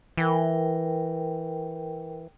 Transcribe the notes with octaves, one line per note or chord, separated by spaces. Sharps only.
E3 A#4 G5